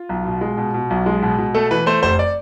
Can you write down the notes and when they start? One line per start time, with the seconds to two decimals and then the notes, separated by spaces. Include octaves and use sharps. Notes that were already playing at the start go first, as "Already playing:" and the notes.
Already playing: F4
0.09 B1
0.25 B2
0.41 G#3
0.58 B2
0.74 B2
0.90 B1
1.06 G#3
1.22 B2
1.38 B2
1.54 A3 A4
1.70 E3 B4
1.86 A3 C5
2.03 F1 C5
2.19 D5